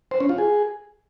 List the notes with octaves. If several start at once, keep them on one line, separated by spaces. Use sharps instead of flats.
C5
C#4
F4
G#4